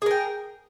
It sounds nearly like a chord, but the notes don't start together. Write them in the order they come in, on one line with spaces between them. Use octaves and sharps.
G#4 A#4 G5